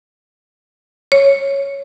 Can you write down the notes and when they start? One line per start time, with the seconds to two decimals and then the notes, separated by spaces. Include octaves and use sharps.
1.12 C#5